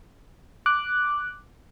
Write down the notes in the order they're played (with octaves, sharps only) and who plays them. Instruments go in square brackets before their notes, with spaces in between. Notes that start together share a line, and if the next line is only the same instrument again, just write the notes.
[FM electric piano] D6 F#6